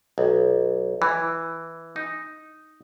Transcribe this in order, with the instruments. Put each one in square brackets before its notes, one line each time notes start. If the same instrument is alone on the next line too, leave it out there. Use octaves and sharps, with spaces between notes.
[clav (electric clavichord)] B1
E3
D#4